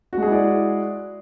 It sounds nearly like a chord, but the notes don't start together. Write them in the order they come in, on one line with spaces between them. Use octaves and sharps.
F#4 G#3 G#4 E4 D5